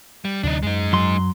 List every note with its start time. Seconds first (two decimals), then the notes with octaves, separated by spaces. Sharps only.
0.25 G3
0.43 D2 C3 F#3 D4 D#4
0.63 F#2 G#3 D#4
0.93 F#3 C6